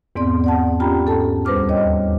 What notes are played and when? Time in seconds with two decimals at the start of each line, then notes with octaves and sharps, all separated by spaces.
0.16 E2 G#2 B3 C4 D5 C6
0.44 D5 F#5 A5
0.80 C#4 F4 G4 G5 A#5 B5
1.06 G#2 A4 A5
1.45 D2 G3 B4 C5 D6 F6
1.68 D#2 C#5 D#5 G5